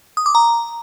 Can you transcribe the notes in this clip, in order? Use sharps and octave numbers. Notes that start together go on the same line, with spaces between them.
D#6
D6
A#5